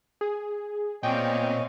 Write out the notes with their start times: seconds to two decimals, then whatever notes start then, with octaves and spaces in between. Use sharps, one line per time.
0.21 G#4
1.03 A#2 B3 C4 C#5 D#5 F5 G5 G#5